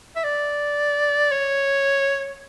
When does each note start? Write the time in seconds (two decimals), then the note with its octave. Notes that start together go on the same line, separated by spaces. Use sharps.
0.16 E5
0.24 D5
1.32 C#5